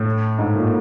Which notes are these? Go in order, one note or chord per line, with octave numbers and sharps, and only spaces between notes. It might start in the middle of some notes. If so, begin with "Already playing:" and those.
Already playing: A2
G#2
A#2